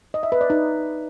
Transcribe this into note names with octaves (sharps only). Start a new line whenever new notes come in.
D#5
E5
B4
D5
D#4